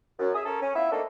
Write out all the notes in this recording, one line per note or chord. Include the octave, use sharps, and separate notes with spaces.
F#2
G#4 E5 D#6
C#4 A4 A#4
C#4
B3 E4 F4 E5
A3 A#3 C4 D4 D#4 A4